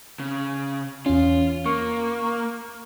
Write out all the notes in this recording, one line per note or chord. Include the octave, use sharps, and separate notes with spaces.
C#3
E2 C#4 F4
A#3 C#6